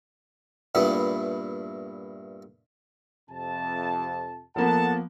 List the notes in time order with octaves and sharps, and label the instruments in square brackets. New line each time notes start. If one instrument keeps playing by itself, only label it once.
[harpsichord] G2 A#2 A3 B3 E4
[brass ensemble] F2 C3 A5
[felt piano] F3 A#3 B3 [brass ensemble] A4 F#5 A5